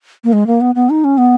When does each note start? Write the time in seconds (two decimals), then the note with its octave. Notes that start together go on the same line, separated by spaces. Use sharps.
0.24 A#3
0.33 G#3
0.47 A#3
0.61 B3
0.75 B3
0.90 D#4
1.04 C#4
1.18 B3